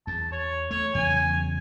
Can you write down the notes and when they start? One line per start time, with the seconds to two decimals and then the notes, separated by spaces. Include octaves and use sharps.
0.07 E2 A5
0.32 C#5
0.71 A3 C#5
0.95 E2 C#3 F#3 G#5